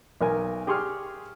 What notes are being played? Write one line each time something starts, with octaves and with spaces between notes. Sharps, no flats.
B1 A#4 G#5
G4 G#4 C6 C#6 F6